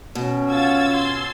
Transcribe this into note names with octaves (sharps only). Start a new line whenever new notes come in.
B2 C#4
F4 F#5 E6 G#6 A6
C6